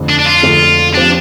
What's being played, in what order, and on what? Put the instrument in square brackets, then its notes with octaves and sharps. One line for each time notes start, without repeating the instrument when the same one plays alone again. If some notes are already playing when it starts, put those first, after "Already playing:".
Already playing: [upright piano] F2 D3 A3
[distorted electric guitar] D4
D4
F4
[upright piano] F2 D3 A3
[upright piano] F3 C4 G4 [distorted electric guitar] D4